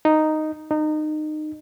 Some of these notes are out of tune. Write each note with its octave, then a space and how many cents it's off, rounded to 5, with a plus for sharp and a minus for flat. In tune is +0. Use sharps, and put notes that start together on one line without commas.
D#4 -5
D#4 -25